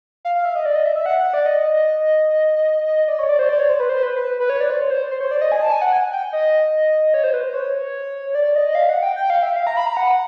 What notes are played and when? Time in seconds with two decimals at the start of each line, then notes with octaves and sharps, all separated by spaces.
0.25 F5
0.35 F5
0.45 E5
0.56 D#5
0.66 D5
0.76 D#5
0.85 E5
0.96 E5
1.06 F#5
1.20 F#5
1.34 D5
1.46 D#5
3.08 D5
3.19 C#5
3.29 D5
3.39 C5
3.49 D5
3.60 C#5
3.70 C5
3.80 B4
3.89 C5
4.03 B4
4.16 B4
4.40 B4
4.50 C#5
4.60 D5
4.70 C5
4.80 C#5
4.91 C5
5.11 C5
5.21 C#5
5.31 D5
5.41 D#5
5.52 G#5
5.61 A5
5.72 G#5
5.82 F#5
5.92 G#5
6.13 G5
6.33 D#5
7.14 C#5
7.24 C5
7.34 B4
7.43 C5
7.54 C#5
8.35 D5
8.56 D#5
8.75 F5
8.89 F#5
9.03 G5
9.16 G5
9.30 F5
9.43 E5
9.56 F5
9.67 A#5
9.77 B5
9.86 A#5
9.97 F#5